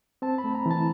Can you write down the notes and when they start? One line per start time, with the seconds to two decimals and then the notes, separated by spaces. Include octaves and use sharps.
0.22 C4 A5
0.38 B5
0.44 A3
0.55 A#5
0.66 E3
0.71 A5